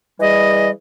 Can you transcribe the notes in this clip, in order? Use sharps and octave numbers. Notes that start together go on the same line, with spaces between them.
E3 G3 G#4 D#5